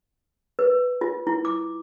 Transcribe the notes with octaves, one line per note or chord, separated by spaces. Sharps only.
B4
F4
E4
D6